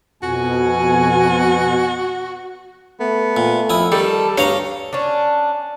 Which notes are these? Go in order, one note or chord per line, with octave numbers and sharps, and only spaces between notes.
F2 B2 F#4 G#5
A3 B3
A#2
F2 E4 D#6
D#3 G3 A4
D2 G2 C#5 D#5 F5 A#5
C#4 D4